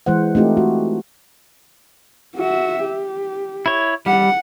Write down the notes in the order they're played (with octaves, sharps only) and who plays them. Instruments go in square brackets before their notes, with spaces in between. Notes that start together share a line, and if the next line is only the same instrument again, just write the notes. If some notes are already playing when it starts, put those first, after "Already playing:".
[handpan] E3 G#3 C5 F#5
A3 C4 D#4 F4 G4
F#4
[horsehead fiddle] F#4 E5
G4
[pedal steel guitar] E4 C#5
[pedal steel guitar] G3 [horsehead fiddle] F#5